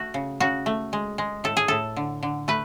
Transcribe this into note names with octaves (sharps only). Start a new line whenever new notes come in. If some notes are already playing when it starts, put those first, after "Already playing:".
Already playing: A3 F#4
C#3
C#3 F#4
A3
G#3
G#3
A2 A4
G#4
A2 A4
D3
D3
A3 B4